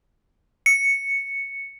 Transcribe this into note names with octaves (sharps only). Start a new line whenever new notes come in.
C#7